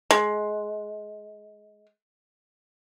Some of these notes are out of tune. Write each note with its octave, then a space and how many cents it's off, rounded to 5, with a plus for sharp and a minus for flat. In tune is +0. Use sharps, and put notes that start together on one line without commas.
G#3 +20